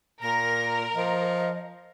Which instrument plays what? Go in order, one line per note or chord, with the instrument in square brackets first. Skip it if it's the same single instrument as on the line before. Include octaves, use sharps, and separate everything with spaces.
[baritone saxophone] A#2 [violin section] A#4 [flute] A#6
[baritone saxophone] F3 [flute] D#5